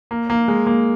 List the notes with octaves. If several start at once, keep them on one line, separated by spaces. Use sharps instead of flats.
A#3
A#3
G#3
A#3